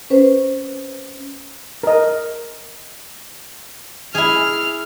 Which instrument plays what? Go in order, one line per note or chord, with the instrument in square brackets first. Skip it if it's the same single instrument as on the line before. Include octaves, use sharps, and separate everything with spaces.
[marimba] C#4 B4 C5
[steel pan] A#4 D#5
[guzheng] E4 G#4 [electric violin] F6